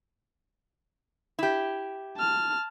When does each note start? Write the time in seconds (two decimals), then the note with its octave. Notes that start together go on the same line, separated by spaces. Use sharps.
1.39 E4 G4
2.18 A5 F6